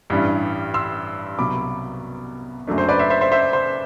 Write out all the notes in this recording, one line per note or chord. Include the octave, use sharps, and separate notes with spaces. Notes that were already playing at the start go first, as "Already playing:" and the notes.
A1 G2 E3 G3
C6 E6
C2 B2 F#3 B5 D6
F#1 F#2 F#3 A3 D4
C5
B4 D5
C5 E5
C5 E5
C5 E5
C5 E5
C5